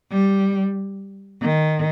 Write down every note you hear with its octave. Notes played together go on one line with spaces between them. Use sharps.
G3
D#3